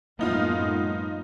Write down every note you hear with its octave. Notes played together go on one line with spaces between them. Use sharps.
F#2 A2 G#3 A#3 B3 D#4 F4